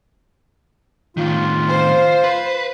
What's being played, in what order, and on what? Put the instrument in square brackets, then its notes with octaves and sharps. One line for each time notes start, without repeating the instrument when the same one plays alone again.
[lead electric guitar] A2 D#3 [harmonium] F4
[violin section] C5
[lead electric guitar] B4